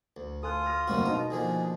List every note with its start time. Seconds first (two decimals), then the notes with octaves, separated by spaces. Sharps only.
0.17 D2
0.43 F4 A4 G#5 D#6 F#6
0.66 F6 A#6
0.88 F#1 G2 A#3 C4 F#4 C5
1.06 B2 D#4 A#5
1.30 D3 F3 A#3 G#4